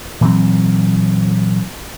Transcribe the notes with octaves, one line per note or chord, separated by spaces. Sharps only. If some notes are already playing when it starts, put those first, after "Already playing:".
A#2 E3 F#3 C4